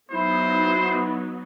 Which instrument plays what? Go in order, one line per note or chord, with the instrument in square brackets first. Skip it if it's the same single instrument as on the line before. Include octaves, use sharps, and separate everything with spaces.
[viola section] F#3 B3 D#4 [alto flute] E4 [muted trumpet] C5